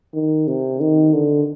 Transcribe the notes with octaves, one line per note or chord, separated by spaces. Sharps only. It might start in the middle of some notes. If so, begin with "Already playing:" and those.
D#3
C3
D#3
D3